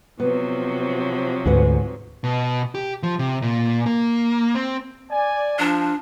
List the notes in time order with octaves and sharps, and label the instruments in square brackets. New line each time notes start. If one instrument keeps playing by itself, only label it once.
[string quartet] C3 F3 F#3 [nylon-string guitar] B3
[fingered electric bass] D2 [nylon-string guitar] G#2 B4 F#5
[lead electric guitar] B2
G4
F3
C3
A#2
A#3
C4
[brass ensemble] D5 G#5
[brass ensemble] F3 [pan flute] D4